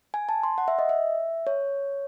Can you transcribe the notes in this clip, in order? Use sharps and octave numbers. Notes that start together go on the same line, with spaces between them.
G#5
A5
C6
F#5
E5
D#5
E5
C#5